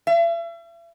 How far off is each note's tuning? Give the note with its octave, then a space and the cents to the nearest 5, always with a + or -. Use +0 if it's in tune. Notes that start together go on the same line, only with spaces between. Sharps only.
E5 +40